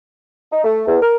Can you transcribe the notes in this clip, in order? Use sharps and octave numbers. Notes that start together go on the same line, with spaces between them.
D#4
A3
E2
A#4